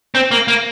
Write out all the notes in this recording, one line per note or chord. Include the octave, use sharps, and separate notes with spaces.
C4
A#3
A#3